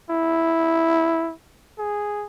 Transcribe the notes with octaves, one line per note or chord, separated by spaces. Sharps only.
E4
G#4